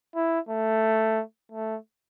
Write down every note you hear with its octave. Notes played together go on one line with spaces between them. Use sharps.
E4
A3
A3